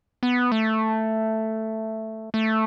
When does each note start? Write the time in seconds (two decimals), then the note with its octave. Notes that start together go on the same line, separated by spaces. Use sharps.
0.23 B3
0.52 A3
2.34 A3